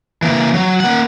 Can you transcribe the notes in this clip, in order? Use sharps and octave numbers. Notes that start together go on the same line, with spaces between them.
E3 A#3
F#3
A#3 F#5